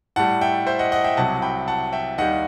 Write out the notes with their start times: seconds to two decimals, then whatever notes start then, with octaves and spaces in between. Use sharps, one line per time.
0.16 A2 G3 F#5 A5
0.41 E5 G5
0.67 C5 E5
0.79 D#5 F#5
0.92 D#5 F#5
1.04 E5 G5
1.17 C2 C3 F#3 F#5 A5
1.42 G5 B5
1.68 F#5 A5
1.93 E5 G5
2.18 D#2 D#3 G3 D#5 F#5